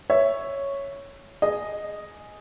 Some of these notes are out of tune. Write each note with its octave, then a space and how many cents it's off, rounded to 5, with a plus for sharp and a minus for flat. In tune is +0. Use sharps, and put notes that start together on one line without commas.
C#5 +0 E5 +0
G#4 +0 D#5 +0